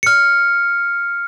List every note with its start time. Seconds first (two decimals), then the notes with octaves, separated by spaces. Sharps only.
0.03 F6 C#7